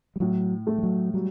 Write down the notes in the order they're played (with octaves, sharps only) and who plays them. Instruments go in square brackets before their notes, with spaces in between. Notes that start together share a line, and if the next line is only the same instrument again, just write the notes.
[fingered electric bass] G3
[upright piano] A2 [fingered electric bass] F#3
[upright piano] A3
[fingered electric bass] G3
F#3
[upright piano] F#3 [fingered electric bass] G3